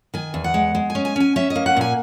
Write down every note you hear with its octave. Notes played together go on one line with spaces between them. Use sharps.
D#3 G#5
E2
F#5
G#3
G#3
G#5
C#4
G#5
C#4 G#5
C#4 E5
D#5
A#3
F#5
A#2 G#5